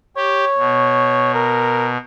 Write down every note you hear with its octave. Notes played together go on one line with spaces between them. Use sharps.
G4 C#5
B2
A#4